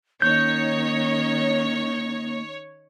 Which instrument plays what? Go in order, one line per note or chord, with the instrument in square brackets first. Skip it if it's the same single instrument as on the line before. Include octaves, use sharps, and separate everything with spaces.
[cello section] D#3 C#4 D#4 [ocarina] A#3 [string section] C#5 [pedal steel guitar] G6